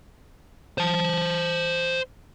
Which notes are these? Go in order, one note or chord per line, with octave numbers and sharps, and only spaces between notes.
C5 A5